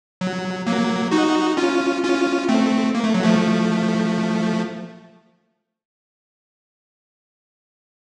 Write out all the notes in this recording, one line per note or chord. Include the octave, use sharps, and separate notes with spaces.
F#3
F#3 A#3
D#4 F#4
C#4 F4
C#4 F4
A3 C4
A#3
A3
F#3
F3 A3